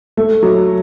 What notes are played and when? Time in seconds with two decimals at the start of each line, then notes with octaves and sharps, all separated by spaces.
0.17 A3
0.43 F#3